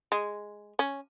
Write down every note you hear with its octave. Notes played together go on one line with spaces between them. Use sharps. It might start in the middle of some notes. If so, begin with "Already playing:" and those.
G#3
C#4